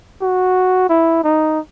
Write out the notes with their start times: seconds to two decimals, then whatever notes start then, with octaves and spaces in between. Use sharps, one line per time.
0.22 F#4
0.89 E4
1.24 D#4